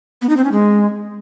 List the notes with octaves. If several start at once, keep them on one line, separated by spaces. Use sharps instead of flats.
B3
D#4
C4
C#4
G#3